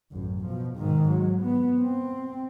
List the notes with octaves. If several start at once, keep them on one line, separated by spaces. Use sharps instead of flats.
A1 F#2
B2 F3
G#2 D#3
F#3
B3
C4